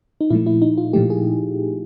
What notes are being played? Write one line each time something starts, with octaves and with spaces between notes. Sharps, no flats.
D#4
A#2 F3 A3 E4
E4
D#4
F4
A#2 F3 A3 G4
G#4